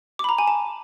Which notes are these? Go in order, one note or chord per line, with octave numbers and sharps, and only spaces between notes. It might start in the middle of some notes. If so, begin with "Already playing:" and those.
D6
B5
A#5
G#5
A5